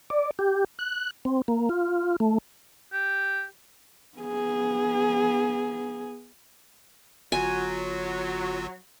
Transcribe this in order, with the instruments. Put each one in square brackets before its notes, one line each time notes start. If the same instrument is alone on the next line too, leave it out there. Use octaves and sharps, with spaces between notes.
[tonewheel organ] D5
G4
F#6
C4
A#3
F4
A3
[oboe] G4
[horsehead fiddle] B3 G#4
[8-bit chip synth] G1 F4 F#4 [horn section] F#3 [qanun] G#5